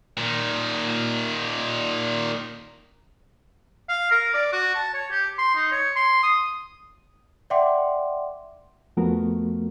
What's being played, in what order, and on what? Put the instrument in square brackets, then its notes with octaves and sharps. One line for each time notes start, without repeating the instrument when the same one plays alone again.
[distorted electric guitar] A#2 D#3
[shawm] F5
A#4
D5
F#4
A5
C#5
G4
C6
D#4
C#5
C6
D#6
[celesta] D5 E5 F#5 G5 C6 D6
[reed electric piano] F2 F3 A3 B3 F#4 A#4